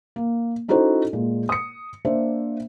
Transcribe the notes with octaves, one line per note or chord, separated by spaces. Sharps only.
A#3
C#4 D#4 E4 F#4 A4 C5
A#2 G#3
D#6 C#7
A#3 D4 C5 E5